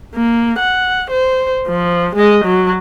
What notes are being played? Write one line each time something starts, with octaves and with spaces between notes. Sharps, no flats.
A#3
F#5
C5
F3
G#3 D#5
F#3